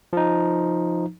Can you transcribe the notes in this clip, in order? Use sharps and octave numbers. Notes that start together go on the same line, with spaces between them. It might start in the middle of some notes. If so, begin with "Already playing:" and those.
F3 D#4